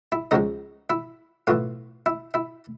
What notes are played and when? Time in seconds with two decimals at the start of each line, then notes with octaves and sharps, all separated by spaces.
0.12 E4 E5
0.31 C#2 C#3 F3 G#3 D#4 D#5
0.90 E4 E5
1.47 B1 A2 E3 F4 F5
2.06 E4 E5
2.34 E4 E5